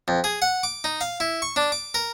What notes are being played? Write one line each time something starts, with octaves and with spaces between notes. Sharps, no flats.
F2
G#4
F#5
D6
D#4
F5
E4
C#6
D4
D6
A#4